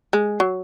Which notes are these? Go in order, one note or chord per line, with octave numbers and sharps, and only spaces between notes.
G#3
F#3